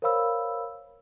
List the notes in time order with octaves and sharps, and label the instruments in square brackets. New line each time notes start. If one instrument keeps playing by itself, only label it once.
[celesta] A#4 C5 C#5 F5 B5 E6